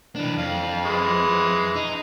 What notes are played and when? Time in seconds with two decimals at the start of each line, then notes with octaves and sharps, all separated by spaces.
0.16 E3 D4
0.38 F2 F5
0.84 E3 G#3
1.75 D#4